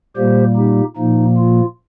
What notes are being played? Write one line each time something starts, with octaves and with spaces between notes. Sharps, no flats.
A#2 G3 A#3 G4 C5
D#4 G4
A#2 F3 A#3 D#4
F4